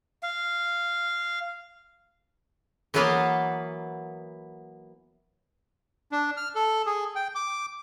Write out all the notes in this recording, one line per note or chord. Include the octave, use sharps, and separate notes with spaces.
F5
E3 F#3 A#3 B3 F5 F#5
D4
F6
A4
G#4
G5
D6